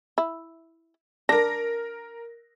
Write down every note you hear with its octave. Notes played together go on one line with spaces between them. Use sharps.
E4
D4 A#4 A#6